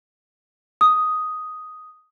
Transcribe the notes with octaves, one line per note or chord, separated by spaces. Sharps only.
D#6